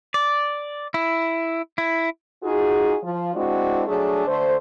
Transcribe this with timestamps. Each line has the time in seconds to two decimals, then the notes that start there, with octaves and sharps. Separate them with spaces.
0.14 D5
0.94 E4
1.78 E4
2.43 D#4 F4 F#4 G#4
3.03 F3 F4
3.34 G#3 C4 D4 E4 F#4
3.87 F#3 A3 D4 G#4
4.27 D3 A3 C5